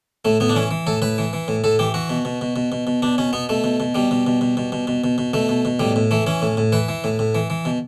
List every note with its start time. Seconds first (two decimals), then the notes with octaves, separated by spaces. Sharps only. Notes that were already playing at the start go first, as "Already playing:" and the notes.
0.25 A2 A3
0.40 A2 B3
0.49 D4
0.55 E3 C#4
0.71 E3
0.87 A2 A4
1.02 A2 B4
1.18 E3
1.33 E3
1.48 A2
1.64 A2 A4
1.79 E3 G4
1.94 E3 F#4
2.09 B2
2.25 B2
2.41 B2
2.56 B2
2.72 B2
2.87 B2
3.02 B2 D4
3.18 B2 C#4
3.33 B2 B3
3.49 B2 A3
3.64 B2
3.80 B2
3.95 B2 G3
4.11 B2
4.27 B2
4.41 B2
4.57 B2
4.72 B2
4.87 B2
5.04 B2
5.18 B2
5.34 B2 A3
5.49 B2
5.65 B2
5.80 A2 G3
5.96 A2
6.11 E3 A3
6.27 E3 C#4
6.42 A2
6.57 A2
6.72 E3 B4
6.89 E3
7.04 A2
7.19 A2
7.35 E3
7.50 E3
7.65 B2